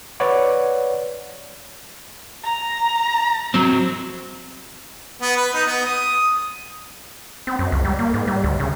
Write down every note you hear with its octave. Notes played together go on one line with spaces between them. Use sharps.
B4 C#5 D5 F#5
A#5
F#3 C4
B3
B4
D#4
B3
D#6
C4
F#2
C#2
G3
A#3
G#2
G3
D2
C#3